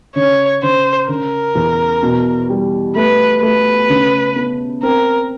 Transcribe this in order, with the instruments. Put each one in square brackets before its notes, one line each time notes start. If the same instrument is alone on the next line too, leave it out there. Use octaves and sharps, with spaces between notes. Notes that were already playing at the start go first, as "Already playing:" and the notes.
[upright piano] C#3 [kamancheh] C#5
[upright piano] C#3 [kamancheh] C5
[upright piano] C#3 [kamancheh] A#4
[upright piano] E2
B2
G3
[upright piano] A3 [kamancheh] B4
[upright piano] A3 [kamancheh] B4
[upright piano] C#3
B3
[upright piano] C4 [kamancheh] A#4